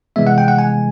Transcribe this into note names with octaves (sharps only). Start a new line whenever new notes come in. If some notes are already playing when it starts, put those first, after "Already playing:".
C3 E3 G#3 B3 E5
F#5
G5
F#5
G#5